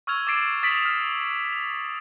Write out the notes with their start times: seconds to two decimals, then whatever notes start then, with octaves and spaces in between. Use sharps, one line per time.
0.07 C#6 E6 F6 G#6 F7
0.27 D6 E6 A6 C7 D7 E7
0.63 D#6 A6 B6 D7 F#7
0.85 F6
1.53 F7